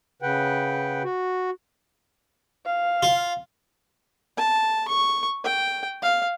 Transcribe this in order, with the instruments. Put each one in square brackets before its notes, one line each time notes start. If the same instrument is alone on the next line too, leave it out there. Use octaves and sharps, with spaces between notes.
[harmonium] C#3 B4 F#5 G5
F#4
[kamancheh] F5
[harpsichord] F4
[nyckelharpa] A5
C#6
G5
F5